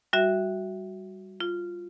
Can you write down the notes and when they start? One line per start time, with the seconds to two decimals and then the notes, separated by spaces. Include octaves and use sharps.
0.13 G3 F#4 E5
1.40 F4